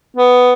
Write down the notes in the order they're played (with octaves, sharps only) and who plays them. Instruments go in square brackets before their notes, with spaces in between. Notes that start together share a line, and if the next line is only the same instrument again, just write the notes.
[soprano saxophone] B3